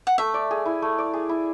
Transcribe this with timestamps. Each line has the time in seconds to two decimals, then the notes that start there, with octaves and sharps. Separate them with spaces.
0.07 F#5
0.18 A3 E5
0.34 D5
0.51 G#4
0.66 E4
0.82 A3
0.98 D5
1.13 G#4
1.29 E4